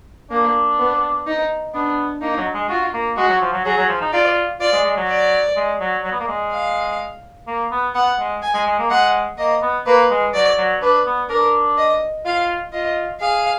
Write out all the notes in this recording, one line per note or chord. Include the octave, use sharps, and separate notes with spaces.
A#3 D4
B3
D#4
B3 D4
A#3 D#4
F#3
G#3
F4 F#4
A#3
G#3 F#4
F#3
F3
F#3
F#3 G#4
F#3
F3
D#4
F4 D5
F4 D5
G#3
G#3
F#3
D5
G#3
F#3
F#3
B3
A#3
G#3
F5
A#3
B3
B3 F#5
G#3
G#5
G#3
G#3
A#3
G#3 F#5
A#3 D#5
B3
A#3 B4
G#3
F#3 D5
F#3
D4 B4
B3
D4 A#4
D#5
F4 F5
F4 D#5
G#4 F5